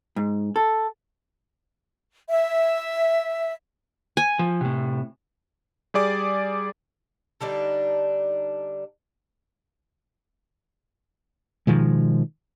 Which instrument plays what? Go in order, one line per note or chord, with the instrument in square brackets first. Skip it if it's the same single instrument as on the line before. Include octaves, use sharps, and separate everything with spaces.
[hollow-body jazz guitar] G#2
A4
[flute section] E5
[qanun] G#5
[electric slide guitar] F3
A2 C3
[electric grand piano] G3 G#4 D5 D6 A6
[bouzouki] D3 G3 D4 D#4
[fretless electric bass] B2 D#3 F3 G#3